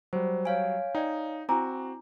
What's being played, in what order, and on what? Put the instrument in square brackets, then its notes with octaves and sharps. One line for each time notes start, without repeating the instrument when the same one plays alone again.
[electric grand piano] F#3 G3 [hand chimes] C5
[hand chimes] C#5 F5 G#5
[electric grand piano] D#4 [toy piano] D5 G5
[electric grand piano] C4 F#4 [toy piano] E4 G#5 A#5 [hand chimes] D6